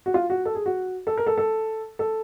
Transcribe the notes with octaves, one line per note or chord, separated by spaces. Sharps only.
F#4
F4
F#4
A4
G#4
F#4
A4
A#4
A4
A4
A4